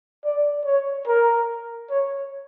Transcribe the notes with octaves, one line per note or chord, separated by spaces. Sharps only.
D5
C#5
A#4
C#5